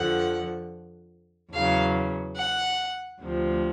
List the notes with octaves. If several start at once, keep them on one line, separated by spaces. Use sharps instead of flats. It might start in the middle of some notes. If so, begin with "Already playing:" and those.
Already playing: F2 D3 F3 F#5
E2 C#3 F#3 F5
F#5
D2 C3 F3